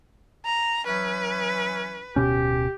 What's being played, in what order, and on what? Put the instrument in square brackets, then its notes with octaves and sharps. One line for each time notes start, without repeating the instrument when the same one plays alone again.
[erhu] A#5
[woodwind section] E3 F#3 C#4 [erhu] B4
[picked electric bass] D1 B2 C#4 [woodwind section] G4